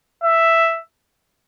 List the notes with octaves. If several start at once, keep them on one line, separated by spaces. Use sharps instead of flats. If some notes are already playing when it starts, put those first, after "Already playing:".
E5